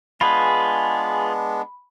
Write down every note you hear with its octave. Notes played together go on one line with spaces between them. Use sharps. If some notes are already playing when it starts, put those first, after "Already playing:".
G#3 B3 D4 F4 G#4 B4 B5